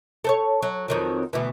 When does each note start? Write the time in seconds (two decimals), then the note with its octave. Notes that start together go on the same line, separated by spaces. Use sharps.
0.24 A4 C5 C#5
0.62 F#3
0.88 F2 D#3 F#3
1.33 D2 B2 E3